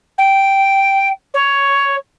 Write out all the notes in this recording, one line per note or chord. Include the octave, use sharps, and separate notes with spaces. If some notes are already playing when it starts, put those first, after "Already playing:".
G5
C#5